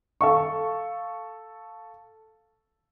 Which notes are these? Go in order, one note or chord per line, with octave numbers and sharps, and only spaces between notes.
A4 F5 C#6